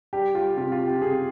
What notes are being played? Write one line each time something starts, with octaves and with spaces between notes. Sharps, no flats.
G3 G4
G3 F4
C3 F4
F4
C3
G4
C3 G#4